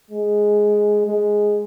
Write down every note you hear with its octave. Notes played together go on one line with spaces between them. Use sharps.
G#3
G#3